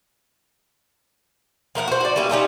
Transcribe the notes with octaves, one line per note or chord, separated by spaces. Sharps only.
F3 A#4 F5 F#5
F#4 C5
F#4 D5
G3 A#3 C#4 E4
G3 C#4 D#4 F4